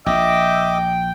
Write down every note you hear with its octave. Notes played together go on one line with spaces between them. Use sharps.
A#1 D#5 E5 G5 D6